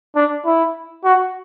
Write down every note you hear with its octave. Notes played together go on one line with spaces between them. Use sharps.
D4
E4
F#4